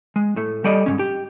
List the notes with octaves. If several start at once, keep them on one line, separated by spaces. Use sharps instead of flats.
G#3
A2 A3
G3 A4 D5 D#5
G#2 C#3 C#4
G4